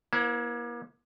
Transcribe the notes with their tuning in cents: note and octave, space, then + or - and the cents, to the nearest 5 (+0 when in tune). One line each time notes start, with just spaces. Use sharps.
A#3 +40 E4 +0 C5 +0